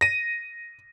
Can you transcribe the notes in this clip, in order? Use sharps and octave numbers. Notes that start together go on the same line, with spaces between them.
A#6 D#7